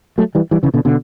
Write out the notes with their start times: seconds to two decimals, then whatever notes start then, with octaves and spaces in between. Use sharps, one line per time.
0.18 F#3 A3
0.35 E3 G3
0.51 E3 G3
0.63 C#3 E3
0.74 B2 D3
0.85 B2 D3